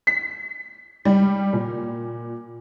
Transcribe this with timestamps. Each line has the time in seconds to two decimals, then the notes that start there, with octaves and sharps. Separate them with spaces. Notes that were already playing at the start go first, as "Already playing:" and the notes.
0.07 B6
1.05 G3
1.53 A#2